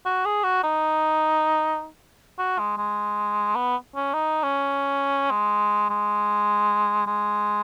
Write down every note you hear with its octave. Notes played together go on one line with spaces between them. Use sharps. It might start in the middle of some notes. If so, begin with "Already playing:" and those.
F#4
G#4
F#4
D#4
F#4
G#3
G#3
B3
C#4
D#4
C#4
G#3
G#3
G#3